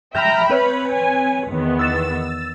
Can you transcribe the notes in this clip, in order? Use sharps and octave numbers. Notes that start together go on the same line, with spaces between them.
E5 G5 A#5 B5 F6 G6
C4 B4 C#5 B5
G#5
E2 D#3 B3
E6 A6 E7